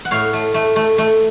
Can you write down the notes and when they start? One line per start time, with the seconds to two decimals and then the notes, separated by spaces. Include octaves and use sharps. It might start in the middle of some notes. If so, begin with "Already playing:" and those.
0.05 F#5
0.11 A2 C#5 F5
0.33 A3
0.54 A3
0.76 A3
0.98 A3